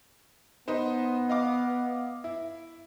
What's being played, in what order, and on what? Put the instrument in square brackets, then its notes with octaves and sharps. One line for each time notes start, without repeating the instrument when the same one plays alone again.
[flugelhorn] B3 [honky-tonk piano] D#4 B4 C5
[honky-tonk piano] D#5 F5 D6
E4